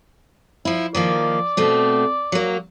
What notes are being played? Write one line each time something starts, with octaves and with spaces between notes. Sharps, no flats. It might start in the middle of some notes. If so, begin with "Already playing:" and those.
F3 E4
D#3 F3 A#3 D5
B2 A3 C4
F#3 A#3